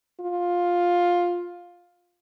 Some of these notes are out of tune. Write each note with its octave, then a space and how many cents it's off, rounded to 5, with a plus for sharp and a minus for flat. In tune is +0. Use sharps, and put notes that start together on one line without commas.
F4 +10